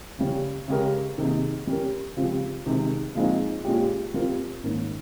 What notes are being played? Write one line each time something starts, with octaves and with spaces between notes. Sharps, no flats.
C#3 G3 C#4
C#3 G#3 C#4 G4 A#4
C3 D#3 A#3 D#4 G#4
G3 C#4 G4 A#4
C#3 F3 G#3 C4 G4
C3 D#3 G#3 C4 D#4
A#2 F3 G#3 C4 D#4
A#2 G#3 C#4 G4
G3 C4 F4 A#4
G#2 D#3 A#3 C#4